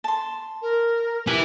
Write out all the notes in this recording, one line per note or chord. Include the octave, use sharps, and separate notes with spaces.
A5 C6
A#4
E4 G4 B4